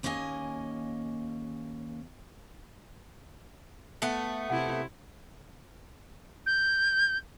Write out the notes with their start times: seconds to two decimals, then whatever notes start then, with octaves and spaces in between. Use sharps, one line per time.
0.03 D#2 A#3 C#4 E4 D#5 G#5
4.02 A3 B3
4.50 C3 E4 F#5
6.46 G6